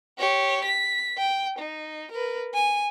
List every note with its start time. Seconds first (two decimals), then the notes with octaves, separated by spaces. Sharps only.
0.18 G4 C#5
0.64 B6
1.17 G5
1.58 D#4
2.11 A#4 B4
2.54 G#5